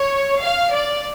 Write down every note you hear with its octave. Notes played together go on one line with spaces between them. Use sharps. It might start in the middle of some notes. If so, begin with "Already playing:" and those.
Already playing: C#5
F5
D5